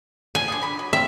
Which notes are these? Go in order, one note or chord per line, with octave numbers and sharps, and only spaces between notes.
F3 G#5
D3 F3 G#4
D3 B5
F#3
C4 F4 E5